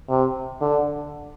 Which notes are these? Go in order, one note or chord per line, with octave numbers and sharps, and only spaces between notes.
C3
D3